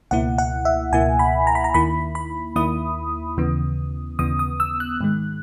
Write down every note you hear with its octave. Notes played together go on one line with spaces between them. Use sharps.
C#2 B2 A#3 E4 F#5
F#5
E5
C#2 B2 A#3 E4 G#5
B5
A#5
B5
A#5
D#2 D#3 A#3 E4 B5
B5
D#2 D#3 A#3 E4 D#6
D#2 C#3 E3 B3
D#2 C#3 E3 B3 D#6
D#6
E6
F#6
G#2 D#3 G#3